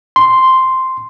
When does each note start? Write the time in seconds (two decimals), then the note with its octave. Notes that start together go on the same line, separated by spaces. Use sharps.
0.16 C6